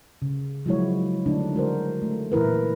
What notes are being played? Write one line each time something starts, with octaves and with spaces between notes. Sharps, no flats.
C#3
F3 F#3 G#3 E4 F#4 C#5
D3 A3 D4 D#4
G#3 F#4 A#4 C5
A3
A#2 E3 E4 A#4 B4